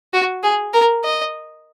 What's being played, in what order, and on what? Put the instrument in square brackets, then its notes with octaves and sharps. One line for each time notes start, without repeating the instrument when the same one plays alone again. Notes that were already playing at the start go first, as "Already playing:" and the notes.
[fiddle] F#4
G#4
A#4
D#5